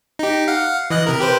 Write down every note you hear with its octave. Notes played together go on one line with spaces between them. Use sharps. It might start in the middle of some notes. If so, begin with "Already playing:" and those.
D#4 G4
F5 F#5
E3 D#5 F#6
C3 A#4
G4 B4 C5